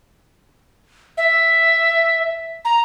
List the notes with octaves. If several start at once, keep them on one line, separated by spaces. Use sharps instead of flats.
E5
A#5